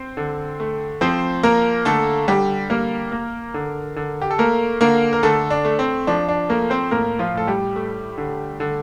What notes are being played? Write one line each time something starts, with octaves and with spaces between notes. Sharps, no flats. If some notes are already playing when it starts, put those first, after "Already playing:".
Already playing: C4 C5
D3
A3
F3 C4 C5
A#3 A#4
D3 A3 A4
D3 G3 G4
G3 A#3 A#4
A#3
D3
D3
G4
A4
A3 A#3 A#4
D3 A#3 A#4
A#4
D3 A3 A4
D4
A3
C4
F3 D4
D4
A3 A#3 A#4
C4 C5
A2 A#3 A#4
F3 F4
A2 A4
G3 G4
A3
D3
D3